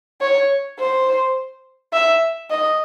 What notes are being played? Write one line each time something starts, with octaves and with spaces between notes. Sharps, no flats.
C#5
C5
E5
D#5